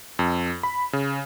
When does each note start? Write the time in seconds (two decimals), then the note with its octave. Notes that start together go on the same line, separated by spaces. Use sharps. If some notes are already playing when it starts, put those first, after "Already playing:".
0.19 F2
0.63 B5
0.93 C#3